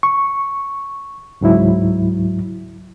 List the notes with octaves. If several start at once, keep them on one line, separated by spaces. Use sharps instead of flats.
C#6
C#2 G#2 F#3 E4